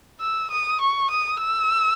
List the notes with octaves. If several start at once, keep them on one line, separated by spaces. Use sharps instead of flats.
E6
D#6
C#6
D#6
E6